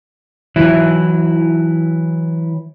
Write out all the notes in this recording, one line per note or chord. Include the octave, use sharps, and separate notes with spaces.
E3 F#3 E4